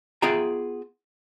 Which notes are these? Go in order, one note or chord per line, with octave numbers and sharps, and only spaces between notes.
B3 F4 G#4 E5 G5 A#5